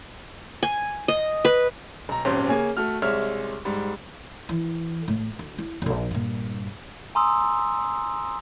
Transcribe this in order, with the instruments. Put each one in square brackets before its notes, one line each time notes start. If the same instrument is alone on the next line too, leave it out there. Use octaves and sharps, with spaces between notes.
[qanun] G#5
D#5
B4
[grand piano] B1 A#5
D#1 G#1 F#2 C#4 C6
C#3 A#3 C#5 G#5
A3 F#4 F6
C2 G#3 C#5 E5 F6
G#2 G3
[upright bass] E3
A2
D2
E4
E1 A#1
G2 A#2
[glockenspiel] G#5 A#5 C6 D#6 E6